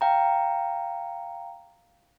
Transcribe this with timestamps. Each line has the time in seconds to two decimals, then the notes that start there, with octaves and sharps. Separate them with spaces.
0.01 F5 G5 A#5